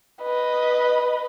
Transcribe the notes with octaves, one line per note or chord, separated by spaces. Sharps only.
B4 D#5